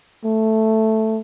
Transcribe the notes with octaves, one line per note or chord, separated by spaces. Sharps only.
A3